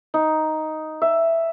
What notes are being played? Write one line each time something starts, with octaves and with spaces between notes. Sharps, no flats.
D#4
E5